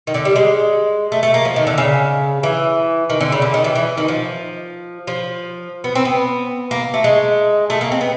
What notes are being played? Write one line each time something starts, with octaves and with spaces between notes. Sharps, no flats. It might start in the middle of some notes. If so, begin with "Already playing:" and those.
D#3
D3
G3
G#3
A3
A3
A#3
F3
D#3
D3
C#3
E3
D#3
D3
C#3
D3
D#3
E3
E3
D#3
F3
F3
B3
C4
B3
A#3
A3
G#3
A3
A#3
C4
B3